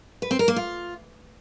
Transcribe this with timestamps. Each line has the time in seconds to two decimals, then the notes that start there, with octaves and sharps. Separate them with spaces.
0.22 B4
0.31 C4
0.39 A#4
0.48 A#3
0.56 F4